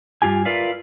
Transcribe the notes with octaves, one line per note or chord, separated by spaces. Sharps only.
G2 C3 F4 G4 G#5
F4 A#4 B4 D5 E5 F5